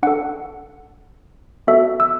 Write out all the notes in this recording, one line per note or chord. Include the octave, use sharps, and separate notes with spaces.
D4 A4 F#5
B3 F#4 A4 E5
E6